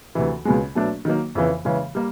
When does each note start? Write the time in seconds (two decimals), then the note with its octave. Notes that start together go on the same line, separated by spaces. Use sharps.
0.15 D2 C3 E3
0.45 C#2 B2 G#3
0.75 B2 F#3 A3 D4
1.05 D#3 F#3 A#3
1.35 F2 C#3 E3
1.65 C#3 E3 G#3
1.95 G3 A#3